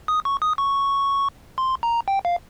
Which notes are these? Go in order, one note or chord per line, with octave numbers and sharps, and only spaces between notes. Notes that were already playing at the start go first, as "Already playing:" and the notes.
D#6
C#6
D#6
C#6
C6
A#5
G5
F5